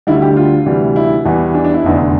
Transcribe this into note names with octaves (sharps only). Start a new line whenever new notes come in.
D2 D3 G3 E4
G4
F4
D2 C3 E3 G3
E4
E2 E3 G3
D4
D4
E4
F1 E2 D3